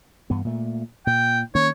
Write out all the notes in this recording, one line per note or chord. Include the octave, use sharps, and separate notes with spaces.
G2 E3 B3
A#2 A3
A#2 G5
D#3 A#3 C#4 C#5